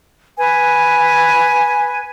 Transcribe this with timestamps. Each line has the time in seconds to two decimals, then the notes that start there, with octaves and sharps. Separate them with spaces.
0.38 B4 G#5